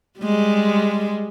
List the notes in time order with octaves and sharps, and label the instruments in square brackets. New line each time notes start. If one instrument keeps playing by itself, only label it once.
[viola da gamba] G3 G#3